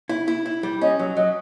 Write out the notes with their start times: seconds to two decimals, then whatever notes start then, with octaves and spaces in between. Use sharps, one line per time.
0.09 E4
0.28 E4
0.46 E4
0.63 G3
0.81 C#4 D#5
0.99 F#3
1.16 F#3 D#5